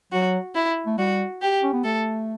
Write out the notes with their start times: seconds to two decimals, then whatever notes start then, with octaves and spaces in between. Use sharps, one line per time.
0.12 F#3 F#4
0.55 E4
0.86 A3
0.98 G3 F#4
1.42 G4
1.63 C#4
1.73 B3
1.84 A3 A4